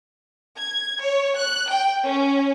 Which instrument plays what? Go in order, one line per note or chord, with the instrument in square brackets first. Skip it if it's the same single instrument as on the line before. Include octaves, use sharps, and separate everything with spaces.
[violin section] G#6
C#5
F#6
G5
C#4